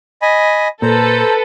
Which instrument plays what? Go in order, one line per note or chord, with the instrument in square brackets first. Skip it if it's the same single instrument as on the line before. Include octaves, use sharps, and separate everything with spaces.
[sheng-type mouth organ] D#5 G#5 B5
[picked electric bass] A#2 [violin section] A4 B4 [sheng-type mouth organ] C5 A#5